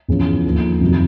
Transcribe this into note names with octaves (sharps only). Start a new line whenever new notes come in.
E2 C#3 F3
D#2 D3 F3
F2 C3 D#3 F#3